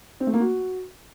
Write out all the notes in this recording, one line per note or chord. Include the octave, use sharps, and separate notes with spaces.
C4
A3
A#3
F#4